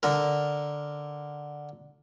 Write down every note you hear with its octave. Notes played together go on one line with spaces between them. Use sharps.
D3 A#4